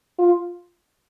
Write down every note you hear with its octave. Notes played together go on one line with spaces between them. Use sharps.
F4